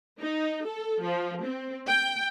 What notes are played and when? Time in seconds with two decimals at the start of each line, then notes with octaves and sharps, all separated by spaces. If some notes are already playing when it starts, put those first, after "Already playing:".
0.20 D#4
0.65 A4
1.03 F3
1.44 C4
1.88 G5